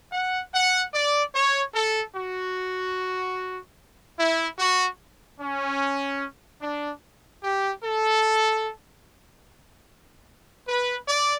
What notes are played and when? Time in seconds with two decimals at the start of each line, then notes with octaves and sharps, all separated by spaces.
0.13 F#5
0.54 F#5
0.94 D5
1.34 C#5
1.74 A4
2.15 F#4
4.19 E4
4.59 F#4
5.40 C#4
6.62 D4
7.43 G4
7.84 A4
10.68 B4
11.08 D5